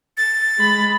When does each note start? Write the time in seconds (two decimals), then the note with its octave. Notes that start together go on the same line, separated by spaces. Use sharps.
0.17 A6
0.58 G#3 B5